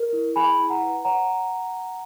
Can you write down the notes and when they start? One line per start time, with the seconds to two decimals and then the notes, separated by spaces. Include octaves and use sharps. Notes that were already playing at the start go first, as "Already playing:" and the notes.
Already playing: A#4
0.13 E4
0.36 G#4 G#5 B5
0.58 E4
0.70 F#5 A#5
0.82 B4
1.05 C#5 F#5 A#5